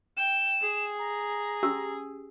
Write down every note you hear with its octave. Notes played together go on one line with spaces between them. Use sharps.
G5 E7
G#4
A#5
C#4 G4 E6